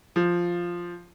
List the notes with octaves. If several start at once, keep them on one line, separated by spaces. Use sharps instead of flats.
F3